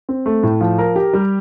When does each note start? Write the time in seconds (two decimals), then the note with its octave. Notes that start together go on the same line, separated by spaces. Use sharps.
0.09 C4
0.26 A3
0.43 A2
0.61 F3
0.78 A#4
0.96 G4
1.13 G3